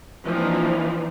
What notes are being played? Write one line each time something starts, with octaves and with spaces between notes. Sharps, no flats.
E3 F3 A#3 C4 D4 D#4